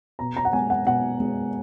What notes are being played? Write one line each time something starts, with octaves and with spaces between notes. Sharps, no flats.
B2 A#5
A#5
F#5
G#3 B3 G#5
F#5
B2 F#5
G#3 B3